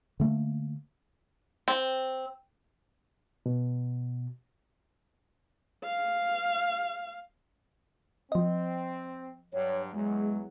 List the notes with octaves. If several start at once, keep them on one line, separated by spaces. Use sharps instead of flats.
D3 A3 A#3
C4
B2
F5
F3 C4 D#5
G2 F#3 C#5
E2 F#3 G#3